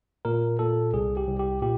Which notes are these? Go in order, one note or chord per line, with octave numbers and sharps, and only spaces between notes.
A#2 A#4
A#2 A4
C2 G#4
G4
C2
G4
A#2 G4